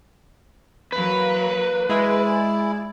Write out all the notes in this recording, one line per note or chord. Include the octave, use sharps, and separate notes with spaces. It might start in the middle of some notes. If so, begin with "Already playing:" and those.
E3 F#3 A#3 B4
G#3 E4 G#4 D5